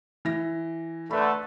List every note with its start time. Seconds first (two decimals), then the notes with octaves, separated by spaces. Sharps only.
0.25 E3 A#6
1.11 D3 A3 B4 B5